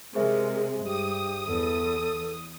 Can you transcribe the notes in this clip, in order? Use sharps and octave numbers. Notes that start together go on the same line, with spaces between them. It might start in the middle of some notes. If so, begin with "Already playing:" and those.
C3 G#3 G#4 A#4 C5 E5
G2 G4 D#6
E2 A4